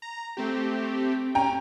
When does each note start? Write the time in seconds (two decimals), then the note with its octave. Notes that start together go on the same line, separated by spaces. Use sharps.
0.02 A#5
0.37 A3 C4 G4
1.35 C#4 G5 A#5